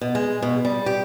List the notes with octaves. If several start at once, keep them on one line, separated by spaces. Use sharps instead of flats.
B2
G#3
B2
G3
G4